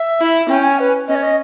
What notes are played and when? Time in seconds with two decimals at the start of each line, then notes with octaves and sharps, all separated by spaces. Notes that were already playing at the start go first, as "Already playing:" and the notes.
Already playing: E5
0.21 E4
0.49 C#4 G5
0.64 G#5
0.79 B4
1.08 C#4 D#5
1.16 C#5
1.23 D#5